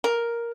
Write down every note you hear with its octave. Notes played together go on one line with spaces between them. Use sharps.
A#4